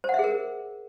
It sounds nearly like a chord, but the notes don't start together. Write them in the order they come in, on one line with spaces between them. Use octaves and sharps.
C5 F#5 E5 G#4 A#4